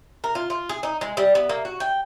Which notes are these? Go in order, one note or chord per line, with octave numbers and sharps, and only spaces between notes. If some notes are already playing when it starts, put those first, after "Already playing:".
A#4
F4
F4
G#4
D#4
G#3
G3
B3
A#3
F#4
G5